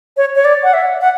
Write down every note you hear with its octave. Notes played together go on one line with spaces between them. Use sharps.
C#5
C#5
D5
F#5
E5
F#5